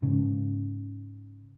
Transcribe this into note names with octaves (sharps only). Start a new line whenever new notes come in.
G#2 C#3